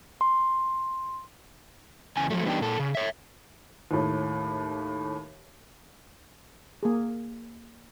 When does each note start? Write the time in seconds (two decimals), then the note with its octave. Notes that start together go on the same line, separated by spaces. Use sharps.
0.21 C6
2.17 E2 C#3 G#5
2.30 F3 F#3 A3
2.46 E3 G3 B3 D4 D#4 G5
2.61 A#2 A4
2.80 C#3
2.95 C#5 E5
3.91 D#2 A2
6.83 A#3 G#4